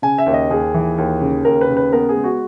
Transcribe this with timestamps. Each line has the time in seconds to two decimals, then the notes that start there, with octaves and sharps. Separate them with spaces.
0.02 C#3 G#5
0.18 E5
0.26 D#2
0.34 D#5
0.51 D#2 G#4
0.74 E3
0.98 D#2
1.21 C#3
1.45 D#2 A#4
1.61 B4
1.69 C#3
1.77 B4
1.93 B3 A#4
2.09 G#4
2.16 G#3
2.24 F#4